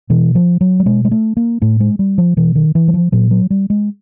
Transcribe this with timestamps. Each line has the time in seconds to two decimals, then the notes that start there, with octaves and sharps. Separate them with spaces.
0.10 B2 E3
0.35 F3
0.61 F#3
0.80 G3
0.86 B2 G#3
1.05 G#3
1.11 A3
1.37 A#3
1.62 A2 A3
1.80 G#3
1.99 G3
2.18 F3
2.37 B2 E3
2.55 D#3
2.75 E3
2.88 F#3
2.94 F3
3.12 A#2 F#3
3.31 F#3
3.50 G3
3.70 G#3